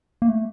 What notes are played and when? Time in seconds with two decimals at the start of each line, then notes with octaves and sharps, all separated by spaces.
0.22 A#3
0.29 A3